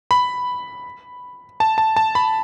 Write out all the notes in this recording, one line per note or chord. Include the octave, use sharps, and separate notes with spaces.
B5
A5
A5
A5
B5